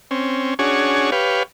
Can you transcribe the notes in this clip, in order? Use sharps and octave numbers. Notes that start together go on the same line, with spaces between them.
C4 C#4
C#4 D4 F#4 G#4 C#5
G4 B4 C#5 F5